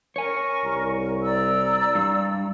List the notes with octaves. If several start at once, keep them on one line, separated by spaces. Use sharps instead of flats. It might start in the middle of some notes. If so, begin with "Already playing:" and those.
A#4 C#5 G#5 C#6
C2
D5 A#5 E6
G2